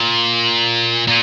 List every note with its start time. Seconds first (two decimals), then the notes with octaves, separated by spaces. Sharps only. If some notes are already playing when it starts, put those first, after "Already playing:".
Already playing: A#2
1.07 A#2